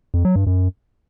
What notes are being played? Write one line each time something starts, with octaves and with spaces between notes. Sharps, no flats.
F2
F#3
G2
F#2